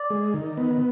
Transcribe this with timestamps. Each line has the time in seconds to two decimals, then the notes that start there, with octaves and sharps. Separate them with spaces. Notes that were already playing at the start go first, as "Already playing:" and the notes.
Already playing: D5
0.10 G#3
0.34 D#3
0.57 B3